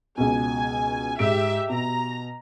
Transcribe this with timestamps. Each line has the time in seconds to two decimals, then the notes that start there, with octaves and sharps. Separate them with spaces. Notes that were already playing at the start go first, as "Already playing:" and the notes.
0.18 C#2 B2 G#5
1.19 G#2 G4 E5 D7
1.70 B2 A#5